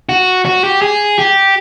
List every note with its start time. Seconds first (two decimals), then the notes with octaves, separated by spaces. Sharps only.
0.09 F#4
0.45 F#4
0.64 G4
0.82 G#4
1.19 G4